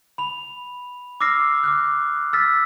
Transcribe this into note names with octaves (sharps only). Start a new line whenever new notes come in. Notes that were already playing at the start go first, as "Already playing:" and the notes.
B5 F7
D6 E6 F6 A#6 C7
D6 F6 F#6
E6 F6 A6 B6